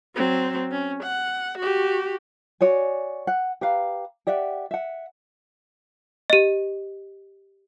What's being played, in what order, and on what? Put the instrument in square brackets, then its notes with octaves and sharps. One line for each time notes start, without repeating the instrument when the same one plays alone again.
[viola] F#3 C4
C#4
F#5
F#4 G4
[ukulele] F#4 C#5 D5 G#5
F#5
G4 B4 F5 A#5
G4 D5 E5 F#5
E5 F#5
[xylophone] G4 D#5